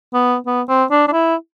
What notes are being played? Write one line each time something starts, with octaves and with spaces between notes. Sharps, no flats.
B3
B3
C4
D4
D4
E4